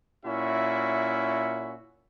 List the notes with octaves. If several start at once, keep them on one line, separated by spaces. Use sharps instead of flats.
A#2 C#4 E4 F#4 E5